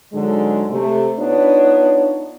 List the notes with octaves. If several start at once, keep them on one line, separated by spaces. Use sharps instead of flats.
G#2 D3 F#3 G#3
C3 A3
B3 D4 D#4 F4 C#5